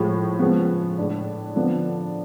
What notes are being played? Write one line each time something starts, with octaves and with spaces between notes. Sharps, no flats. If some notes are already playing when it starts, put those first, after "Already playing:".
Already playing: A2 F3 G#3
C#3 F3 G#3 B3
A2 G#3 D4
D3 F3 B3 D4